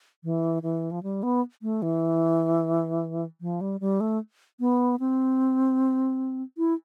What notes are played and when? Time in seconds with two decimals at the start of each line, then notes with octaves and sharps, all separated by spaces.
0.24 E3
0.63 E3
0.91 F3
1.03 G3
1.23 B3
1.62 A3
1.82 E3
3.41 F3
3.61 G3
3.80 G3
4.00 A3
4.60 B3
5.00 C4
6.58 E4